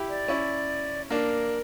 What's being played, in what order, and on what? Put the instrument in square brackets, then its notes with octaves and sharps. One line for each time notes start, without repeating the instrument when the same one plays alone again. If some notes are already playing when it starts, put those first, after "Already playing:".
Already playing: [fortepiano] E4 G4
[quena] D5
[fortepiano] C#4 E4
[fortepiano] A#3 D4 [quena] A#4